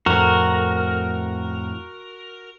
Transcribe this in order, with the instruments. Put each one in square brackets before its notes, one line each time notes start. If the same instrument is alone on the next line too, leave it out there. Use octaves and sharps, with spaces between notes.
[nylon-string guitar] F2 A2 [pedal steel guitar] F#4 A#4